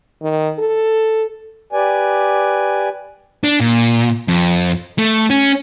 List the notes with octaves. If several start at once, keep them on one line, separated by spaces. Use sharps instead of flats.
D#3
A4
G4 B4 D5 G#5
D4
A#2
F2
A3
C#4